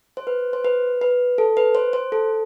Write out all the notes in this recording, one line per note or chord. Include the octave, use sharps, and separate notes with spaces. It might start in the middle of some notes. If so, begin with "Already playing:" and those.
C5
B4
C5
B4
B4
A4
B4
C5
C5
A4